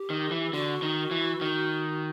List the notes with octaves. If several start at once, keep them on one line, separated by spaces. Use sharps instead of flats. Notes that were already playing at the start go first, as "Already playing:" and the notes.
Already playing: G4
D#3
E3
D3 F#4
D#3
E3
D#3